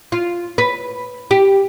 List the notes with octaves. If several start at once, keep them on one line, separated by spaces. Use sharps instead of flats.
F4
B4
G4